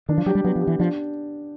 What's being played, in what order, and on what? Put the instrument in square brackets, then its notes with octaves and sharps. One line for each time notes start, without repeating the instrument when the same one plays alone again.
[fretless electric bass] D#3 [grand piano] D4
[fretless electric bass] F3
[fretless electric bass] F#3 [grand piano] G4
[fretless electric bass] G3
[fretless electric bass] F#3 [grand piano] B3
[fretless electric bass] F3
[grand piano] G4
[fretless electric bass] E3
[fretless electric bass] F3 [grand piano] D4